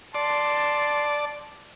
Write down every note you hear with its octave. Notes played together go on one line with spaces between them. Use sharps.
D5 A5 C6